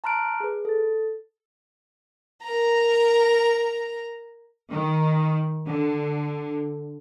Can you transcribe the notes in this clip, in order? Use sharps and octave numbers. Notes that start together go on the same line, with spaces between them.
A5 A#5 C6 F6 F#6 D7
G#4 B4
A4 A6
A#4 A#5
D#3
D3